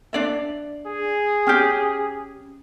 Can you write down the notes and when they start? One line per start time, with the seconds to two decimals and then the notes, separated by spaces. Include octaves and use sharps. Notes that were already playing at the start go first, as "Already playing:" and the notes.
0.13 D4 D5 E5
0.86 G#4
1.47 C#4 G4 G5 F6 G6